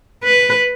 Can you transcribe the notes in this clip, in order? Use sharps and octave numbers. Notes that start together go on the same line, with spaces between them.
B4